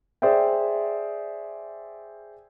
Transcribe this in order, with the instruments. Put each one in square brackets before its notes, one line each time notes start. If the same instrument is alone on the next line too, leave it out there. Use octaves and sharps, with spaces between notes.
[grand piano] G#4 C5 D5 E5 G5